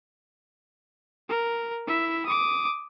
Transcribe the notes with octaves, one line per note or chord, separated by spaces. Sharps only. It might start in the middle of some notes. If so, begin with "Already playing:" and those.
A#4
E4 E5
D6 D#6